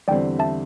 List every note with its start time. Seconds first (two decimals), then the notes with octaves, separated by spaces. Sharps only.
0.08 E2 D3 G3 C4 D5 G5
0.39 E5 A5